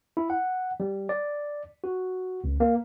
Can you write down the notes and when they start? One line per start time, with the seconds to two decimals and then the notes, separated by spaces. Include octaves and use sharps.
0.17 E4
0.30 F#5
0.80 G3
1.09 D5
1.84 F#4
2.44 C#2
2.60 A#3